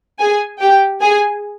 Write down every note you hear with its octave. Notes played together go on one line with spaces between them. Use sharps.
G#4 G#5
G4 G5
G#4 G#5